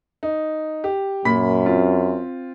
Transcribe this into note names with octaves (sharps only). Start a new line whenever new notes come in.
D#4
G4
F#2 A#2 B5 B6
C4 F4